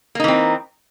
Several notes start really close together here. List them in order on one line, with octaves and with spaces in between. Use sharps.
A#3 D#4 E3 C4